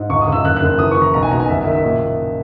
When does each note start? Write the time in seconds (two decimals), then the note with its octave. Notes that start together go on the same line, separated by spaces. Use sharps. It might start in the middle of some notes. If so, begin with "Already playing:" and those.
Already playing: G#2
0.10 C#2 C#6
0.21 D#6
0.28 C#2 E6
0.45 F#1 F#6
0.57 F#6
0.62 F#1
0.79 E3 D#6
0.91 C#6
0.97 E3 A#5
1.14 B1 A#5
1.23 G#5
1.31 B2 A#5
1.40 G#5
1.49 F#1 E5
1.61 E5
1.66 D#3
1.71 E5
1.83 A#2
2.00 A#2